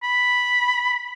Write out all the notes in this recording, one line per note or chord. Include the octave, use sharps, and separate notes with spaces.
B5